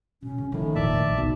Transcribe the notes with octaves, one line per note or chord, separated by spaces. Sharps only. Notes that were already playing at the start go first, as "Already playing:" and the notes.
B2 C#4
C#3
A2 D#3 F3 D#4
E1 A#1 A#2 D5 E5 A5
A#1 A2
G1 C2 B2 D#4